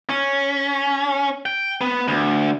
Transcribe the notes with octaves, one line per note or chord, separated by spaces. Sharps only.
C#4
G5
B3
D2